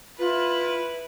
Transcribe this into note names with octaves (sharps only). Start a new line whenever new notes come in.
E4 F4 B4